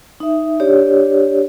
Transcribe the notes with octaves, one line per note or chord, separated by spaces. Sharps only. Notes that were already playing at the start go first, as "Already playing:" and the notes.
D#4 E5
D4 G4 C#5 D5